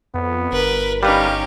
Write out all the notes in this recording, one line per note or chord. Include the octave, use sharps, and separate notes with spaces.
F2 B3
G1 A#4 B4
G3 C#4 D#4 G4 B4 F5